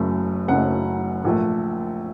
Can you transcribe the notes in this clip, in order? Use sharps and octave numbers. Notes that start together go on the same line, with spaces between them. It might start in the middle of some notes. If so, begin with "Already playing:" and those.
Already playing: F#1 F#2 C#3 F#3 A3
F#1 F#2 C#3 F#3 A3 F#5
A#1 A#2 A3